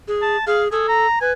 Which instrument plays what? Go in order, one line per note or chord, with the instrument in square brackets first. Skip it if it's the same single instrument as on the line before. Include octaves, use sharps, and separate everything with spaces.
[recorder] G#4
[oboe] A5
[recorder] G#4 [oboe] F5
[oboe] G#4 [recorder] A4
[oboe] A#5
[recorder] B4 [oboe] G#5